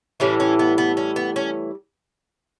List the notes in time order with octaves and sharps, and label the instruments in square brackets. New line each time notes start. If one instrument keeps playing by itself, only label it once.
[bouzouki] A2 E3 G3 C#4
C#4
B3
B3
C#4
B3
C#4